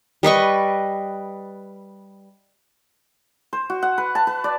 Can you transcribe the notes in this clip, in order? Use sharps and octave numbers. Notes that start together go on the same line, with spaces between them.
G3 B4 D#5 C#6
C5
F#4
F#5
B4
A5
B4
D5